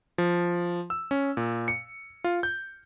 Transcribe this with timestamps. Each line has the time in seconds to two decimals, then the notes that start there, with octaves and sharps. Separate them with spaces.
0.18 F3
0.90 E6
1.11 C#4
1.37 A#2
1.68 C#7
2.24 F4
2.43 G6